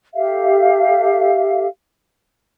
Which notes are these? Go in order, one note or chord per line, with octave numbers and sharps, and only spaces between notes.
G4 A4 E5 F5